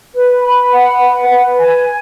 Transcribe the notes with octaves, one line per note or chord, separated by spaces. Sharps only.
B4
B5
F#5
B4
B4
G#5